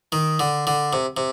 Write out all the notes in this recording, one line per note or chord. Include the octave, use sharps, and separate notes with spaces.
D#3
D3
D3
C3
C3